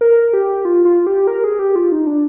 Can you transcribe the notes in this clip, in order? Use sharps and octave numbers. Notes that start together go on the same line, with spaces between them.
A#4
G4
F4
F4
G4
A#4
G#4
G4
F4
D#4
D4